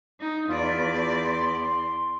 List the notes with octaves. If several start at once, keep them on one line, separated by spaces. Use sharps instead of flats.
D#4
E2 F4 D5
C6